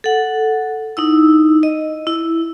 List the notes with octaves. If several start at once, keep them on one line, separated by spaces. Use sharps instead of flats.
A4 F#5
D#4 E4 E6
D#5
E4